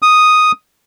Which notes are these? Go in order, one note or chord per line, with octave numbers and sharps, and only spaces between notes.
D#6